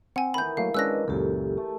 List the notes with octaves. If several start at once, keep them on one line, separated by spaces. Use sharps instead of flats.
C4 F#5 G#5
D#3 E3 B5 G6
F#3 A3 A#3 F5
G#3 C#4 D4 B4 D#5 E6 F#6 A#6
C#2 F#2 A#2 G4 A4
A3